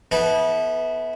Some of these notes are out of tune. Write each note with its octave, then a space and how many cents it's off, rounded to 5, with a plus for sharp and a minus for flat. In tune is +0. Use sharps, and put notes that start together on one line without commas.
B3 +0 E4 -30 A4 -30